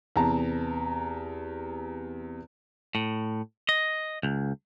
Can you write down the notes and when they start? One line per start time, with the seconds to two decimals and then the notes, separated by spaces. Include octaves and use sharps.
0.16 E2 C3 A5 A#5
2.95 A2
3.69 D#5
4.23 C#2